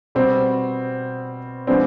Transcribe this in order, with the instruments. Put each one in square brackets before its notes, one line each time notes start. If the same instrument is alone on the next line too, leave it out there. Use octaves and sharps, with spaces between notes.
[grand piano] B2 G3 B3 [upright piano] C4
[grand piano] F3 G#3 B3 D4 [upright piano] C4